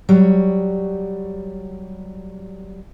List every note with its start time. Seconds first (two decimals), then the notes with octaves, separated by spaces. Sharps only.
0.09 F#3 G3 C#5